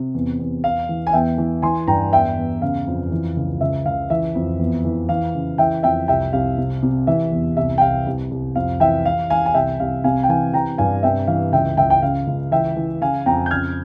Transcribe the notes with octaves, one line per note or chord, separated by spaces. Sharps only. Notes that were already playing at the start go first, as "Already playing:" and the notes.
Already playing: C3
E2
E2
E2 F5
E3
G#5
E2 E5 G5
E3
E3 G#5 C6
G2 G5 A#5
E2 E5 G5
E2
C#3 F5
F2
E3
C#2
C#2 E5
C#2 F5
E3 E5
F2
E2
E3
E3 F5
C#3
E3 E5 G5
F2 E5 G5
C2 E5 G5
C2 F5
C3
C3
E3 E5
E2
C2 E5
G5
C2 F5
C2
C2
F2 F5
E3 E5 G5
E3 F5
E3 F5 G#5
G#5
C2 E5 G5
C2 F5
C3 F5 G#5
G5
E3 F5 G#5
E3 G5 A#5
G2 F5 G#5
C3 E5 G5
E3 F5
C#2 E5 G5
C#2 E5 G5
G5
C#3 F5
C#2
E3 E5 G5
E3
C#3 F5 G#5
F2 G5 A#5
G6
C#3 F6 G#6